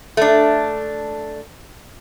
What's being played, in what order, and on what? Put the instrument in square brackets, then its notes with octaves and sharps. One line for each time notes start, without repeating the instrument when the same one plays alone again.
[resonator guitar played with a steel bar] A3 D4